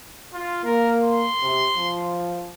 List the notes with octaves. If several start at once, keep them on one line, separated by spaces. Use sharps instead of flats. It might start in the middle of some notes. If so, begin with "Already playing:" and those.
F4
A#3 A#4
C6
C3
F3